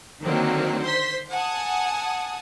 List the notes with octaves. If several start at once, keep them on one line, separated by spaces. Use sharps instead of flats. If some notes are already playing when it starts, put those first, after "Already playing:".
D3 D#3 F#3 A#3 C4
C5 C6 B6
F#5 G#5 A5 D#6